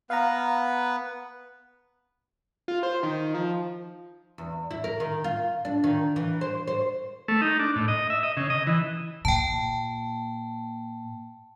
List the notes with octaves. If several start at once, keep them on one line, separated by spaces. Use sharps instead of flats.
B3 B4 F5 A#5
F4
C5
D#3
F3
E2
E4
A#4
D#3
F4
D4
D#3
E3
C5
C5
A3
D#4
D4
A2
D#5
E5
D#5
C#3
D#5
E3
A#2 G5 A5